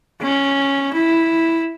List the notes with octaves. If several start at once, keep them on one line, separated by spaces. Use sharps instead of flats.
C#4
E4